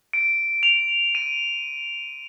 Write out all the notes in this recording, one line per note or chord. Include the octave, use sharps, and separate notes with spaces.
D7
F7
D#7